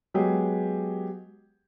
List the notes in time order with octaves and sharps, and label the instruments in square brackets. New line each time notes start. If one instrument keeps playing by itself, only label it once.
[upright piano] F#3 G#3 B3 G4 G#4